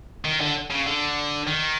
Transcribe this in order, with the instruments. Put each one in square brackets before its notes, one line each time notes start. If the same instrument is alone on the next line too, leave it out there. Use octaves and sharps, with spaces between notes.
[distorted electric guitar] D#3
D3
C#3
D3
D#3